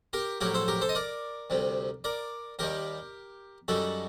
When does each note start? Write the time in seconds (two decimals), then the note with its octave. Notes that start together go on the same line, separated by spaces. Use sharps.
0.13 G4 A#4
0.41 A#1 A2 F#3 G4 A#4
0.54 A4 C5
0.68 G4 A#4
0.81 A4 C5
0.89 D#5
0.95 A#4 D5
1.50 D2 C3 G3
2.04 A#4 D5
2.59 D#2 D#3 G3 G4 A#4
3.68 F#2 D#3 G3 F#4 A4